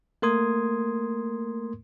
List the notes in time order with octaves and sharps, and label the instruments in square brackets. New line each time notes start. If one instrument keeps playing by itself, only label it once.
[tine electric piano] A3 A#3 A#4 C6 D#6 G#6